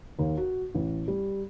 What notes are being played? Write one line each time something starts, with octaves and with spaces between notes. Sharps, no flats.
D#2
F#4
A1
G3